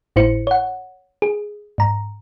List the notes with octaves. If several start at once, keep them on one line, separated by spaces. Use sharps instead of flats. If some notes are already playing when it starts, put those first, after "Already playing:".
G#1 A2 E4 C5 C#7
C#5 F#5
G#4
G#2 A#5